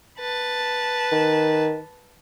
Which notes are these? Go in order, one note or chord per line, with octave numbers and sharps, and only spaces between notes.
B4 A5
D#3